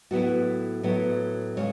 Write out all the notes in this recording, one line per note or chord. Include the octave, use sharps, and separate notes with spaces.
A2 F#3 B3 E4 F#4
A2 F#3 B3 E4
C#3 G#3 C#5